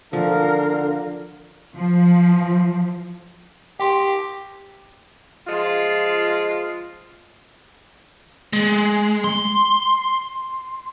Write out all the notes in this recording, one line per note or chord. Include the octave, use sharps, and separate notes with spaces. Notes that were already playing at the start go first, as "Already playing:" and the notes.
D3 F3 A#4 F5
F3
G4 G5 C6
F3 G#3 F4
G#3
C6